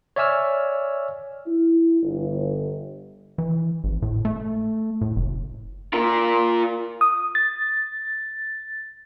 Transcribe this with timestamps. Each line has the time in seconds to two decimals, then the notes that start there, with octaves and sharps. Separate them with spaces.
0.16 C#5 D5 E5 G#5 E6 F6
1.46 E4
2.02 G1
3.38 E3
3.84 G#1
4.02 A2
4.25 A3
5.01 A2
5.16 F#1
5.93 F4 A#4
7.01 D#6
7.35 A6